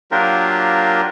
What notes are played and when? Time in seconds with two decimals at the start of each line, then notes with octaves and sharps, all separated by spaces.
0.12 F#3 A#3 D4 F4 G4 A#4